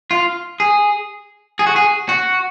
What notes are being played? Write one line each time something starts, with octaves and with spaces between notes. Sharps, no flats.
F4
G#4
G#4
F#4
G#4
F#4